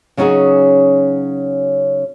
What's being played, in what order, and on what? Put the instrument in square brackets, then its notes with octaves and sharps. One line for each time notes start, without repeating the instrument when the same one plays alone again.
[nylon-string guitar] C#3 F#3 C#4 D#4 F#4 G#4